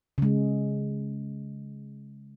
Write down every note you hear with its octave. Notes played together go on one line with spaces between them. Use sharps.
C#3 G#3